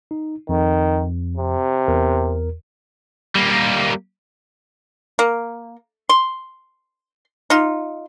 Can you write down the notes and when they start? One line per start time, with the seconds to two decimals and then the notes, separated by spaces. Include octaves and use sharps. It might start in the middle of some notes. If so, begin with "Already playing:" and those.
0.11 D#4
0.49 F2 D#3
1.37 C3
1.88 E2 A#4
3.35 G3 A#3
5.19 A#3
6.09 C6
7.50 D#4 F4